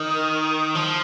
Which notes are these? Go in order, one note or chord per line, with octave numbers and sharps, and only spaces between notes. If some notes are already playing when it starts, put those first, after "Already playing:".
Already playing: D#3
F3